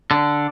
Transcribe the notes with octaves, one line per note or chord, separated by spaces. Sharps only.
D3